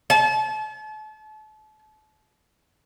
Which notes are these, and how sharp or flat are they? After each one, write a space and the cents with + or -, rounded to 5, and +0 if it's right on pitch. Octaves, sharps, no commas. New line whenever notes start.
A5 -35